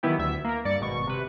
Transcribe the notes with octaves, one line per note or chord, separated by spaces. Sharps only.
D#3 E3 F#3 B3 E4 G4
D2 E5 B6
A#3 A#4
G2 D5 A6 C#7
G#1 B2 C#6
C3 B4